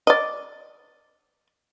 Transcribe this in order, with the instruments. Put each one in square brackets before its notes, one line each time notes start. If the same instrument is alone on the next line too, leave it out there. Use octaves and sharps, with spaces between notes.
[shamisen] D5 D#5